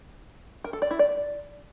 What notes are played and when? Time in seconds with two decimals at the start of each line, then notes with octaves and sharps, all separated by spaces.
0.64 A#4
0.73 A4
0.82 D5
0.91 E4
0.99 D5